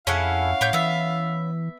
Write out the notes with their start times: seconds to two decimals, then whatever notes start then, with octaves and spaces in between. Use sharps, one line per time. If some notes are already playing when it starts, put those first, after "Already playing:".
0.07 F2 C#4 E4 G#4 A4 F5 F#5
0.61 A2 G4 C#5 G6
0.73 E3 B3 E5